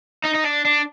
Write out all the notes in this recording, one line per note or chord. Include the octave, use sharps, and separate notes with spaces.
D#4
D#4
D4
D4